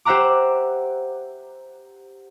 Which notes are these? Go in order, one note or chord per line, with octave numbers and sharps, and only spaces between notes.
G4 C5 E5 F#5 A#5 D6